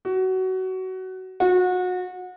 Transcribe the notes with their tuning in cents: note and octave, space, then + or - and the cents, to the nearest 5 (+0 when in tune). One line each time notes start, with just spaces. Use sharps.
F#4 +20
F#4 -30